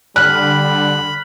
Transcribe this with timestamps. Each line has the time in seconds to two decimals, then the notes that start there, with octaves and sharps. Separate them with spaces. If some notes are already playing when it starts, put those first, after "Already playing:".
0.16 D3 G3 B5 F6 F#6